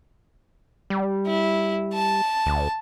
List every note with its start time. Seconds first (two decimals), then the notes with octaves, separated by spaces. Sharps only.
0.90 G3
1.27 E4
1.93 A5
2.46 D2